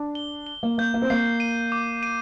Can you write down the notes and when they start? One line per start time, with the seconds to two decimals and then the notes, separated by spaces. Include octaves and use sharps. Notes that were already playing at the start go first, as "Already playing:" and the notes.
Already playing: D4
0.15 G7
0.47 G7
0.63 A#3
0.78 A#3 G6
0.94 A#3
1.02 C4
1.10 A#3 C7
1.40 D#7
1.72 D6
2.03 D#7